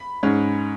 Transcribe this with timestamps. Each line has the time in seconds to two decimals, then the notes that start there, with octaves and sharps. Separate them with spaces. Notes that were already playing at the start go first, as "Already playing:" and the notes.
Already playing: B5
0.23 G#2 G#3 C#4